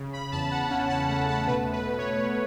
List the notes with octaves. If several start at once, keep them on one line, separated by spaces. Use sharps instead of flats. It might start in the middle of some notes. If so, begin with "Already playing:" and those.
Already playing: C#3
B5
E2 A5
F#5
C#4 F#5
A5
A3 F#5
A5
B2 B4
B4
B2
C#5
B2